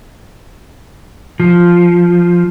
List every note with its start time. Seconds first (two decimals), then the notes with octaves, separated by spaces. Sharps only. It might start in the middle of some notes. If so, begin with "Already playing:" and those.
1.40 F3